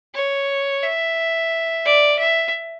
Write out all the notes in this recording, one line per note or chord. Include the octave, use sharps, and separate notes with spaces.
C#5
E5
D5
E5